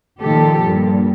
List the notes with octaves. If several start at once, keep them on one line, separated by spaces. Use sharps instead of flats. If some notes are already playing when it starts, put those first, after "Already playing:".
A#2 D#3 F3 G4 A4
G2 A#2